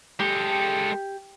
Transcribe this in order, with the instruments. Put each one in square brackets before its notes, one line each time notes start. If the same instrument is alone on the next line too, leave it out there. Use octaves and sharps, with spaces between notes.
[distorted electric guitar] G#3 A4 [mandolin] G4